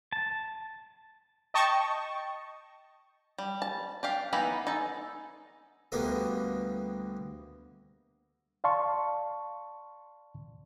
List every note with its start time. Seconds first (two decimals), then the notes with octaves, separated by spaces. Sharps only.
0.13 A5
1.54 D#5 G5 A5 C#6
3.38 G3
3.62 A5
4.03 D4 G4 F5
4.33 E3 A#3 B3 D#4 B5
4.67 D#4 G#4 A4
5.92 D2 D3 G3 A#3 B3 D#6
8.64 D5 F5 A5 C6 C#6